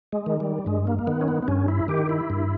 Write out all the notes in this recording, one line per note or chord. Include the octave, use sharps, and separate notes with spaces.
G#3
D#3
G3
G2 G#3
A#3
A#3
D#3 B3
C#4
B3
B3
G2 C#4
E4
D#3 G4
E4
G2